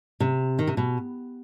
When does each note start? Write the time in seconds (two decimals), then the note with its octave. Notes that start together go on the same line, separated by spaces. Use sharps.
0.20 C3
0.59 D#3
0.67 C3
0.77 B2